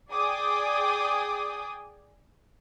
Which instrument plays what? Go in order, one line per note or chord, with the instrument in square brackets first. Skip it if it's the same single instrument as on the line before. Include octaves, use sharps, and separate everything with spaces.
[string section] G#4 D5 G5 G#5 D6 D#6